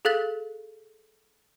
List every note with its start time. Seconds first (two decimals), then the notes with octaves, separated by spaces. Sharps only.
0.05 G#4 A4 F5 F#6 A6 F#7